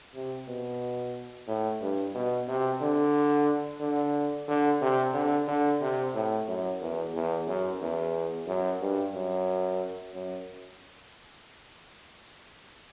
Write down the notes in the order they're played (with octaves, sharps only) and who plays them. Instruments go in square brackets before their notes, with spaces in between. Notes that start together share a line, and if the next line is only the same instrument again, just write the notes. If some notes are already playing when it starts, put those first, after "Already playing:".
[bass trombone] C3
B2
A2
G2
B2
C3
D3
D3
D3
C3
D3
D3
C3
A2
F#2
E2
E2
F#2
E2
F#2
G2
F#2
F#2